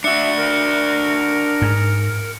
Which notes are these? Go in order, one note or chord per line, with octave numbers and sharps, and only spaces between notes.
D4 F#4 E5 C#7
A#4
G#2